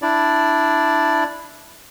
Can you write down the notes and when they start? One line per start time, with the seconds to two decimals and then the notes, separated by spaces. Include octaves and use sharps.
0.02 D4 E4 D5